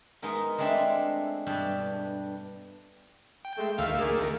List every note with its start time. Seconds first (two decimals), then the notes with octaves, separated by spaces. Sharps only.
0.22 G#3 B3 D#4 A#4
0.58 G#3 A3 C4 D4 E4 E5
1.46 G2 B2 G3 D4
3.45 G5
3.58 G#3 A3
3.78 D2 D#3 A3 E5 F5
3.99 A#3 G#4
4.20 A#4